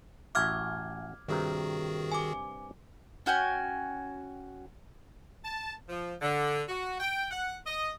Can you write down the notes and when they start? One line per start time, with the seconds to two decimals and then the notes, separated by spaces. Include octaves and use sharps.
0.35 A1 F#4 E5 D6 F6 G#6
1.28 G2 C3 D#3 F#4 G#4 A#4
2.12 G#5 D6
3.26 C#4 F#4 G5 G#5
5.45 A5
5.89 F3
6.22 D3
6.69 F#4
7.00 G5
7.31 F#5
7.66 D#5